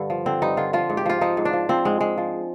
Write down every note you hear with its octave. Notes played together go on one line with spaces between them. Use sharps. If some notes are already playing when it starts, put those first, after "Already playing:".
Already playing: G2 D3
F3
D3 C4
G2 D#4
D3 F4
F3 F4
G#2
G4
F3 F4
F3 D#4
G#2
D4
F3
F3 C4
G#2 G#3
G#2 G#3
F3